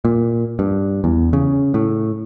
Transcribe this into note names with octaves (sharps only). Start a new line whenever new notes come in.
A#2
G2
E2
C#3
A2